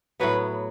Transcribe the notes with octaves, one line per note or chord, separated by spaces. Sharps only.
A2 F#3 B3 B4